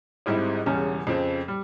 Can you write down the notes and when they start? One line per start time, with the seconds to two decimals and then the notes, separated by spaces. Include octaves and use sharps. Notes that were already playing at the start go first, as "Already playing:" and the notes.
0.26 G#1 G#2 G3 C4 E4
0.66 E1 E2 C#3 G3 C#4
1.07 F2 C#3 F3 C4
1.48 G3